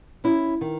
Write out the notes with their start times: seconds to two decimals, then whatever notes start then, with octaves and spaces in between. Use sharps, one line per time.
0.24 C#4 E4
0.61 D#3